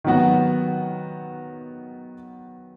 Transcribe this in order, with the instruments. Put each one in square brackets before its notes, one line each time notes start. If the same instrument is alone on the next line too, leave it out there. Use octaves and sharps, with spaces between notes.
[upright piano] D#3 F#3 B3 F#4